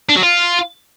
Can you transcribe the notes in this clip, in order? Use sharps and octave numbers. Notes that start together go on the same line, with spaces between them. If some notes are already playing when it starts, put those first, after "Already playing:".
D4
F#3
F4